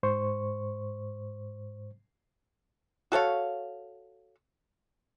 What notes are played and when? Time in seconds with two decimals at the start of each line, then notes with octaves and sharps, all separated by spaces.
0.03 G#2 C5 C#6
3.12 F#4 A4 C#5 F5